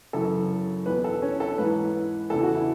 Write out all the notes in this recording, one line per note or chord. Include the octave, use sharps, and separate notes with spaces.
F#2 C#3 E3 A4
E2 B2 B4
A4
C#4
A4
G#2 E3 B4
E2 C#3 E3 A4
F#4
E4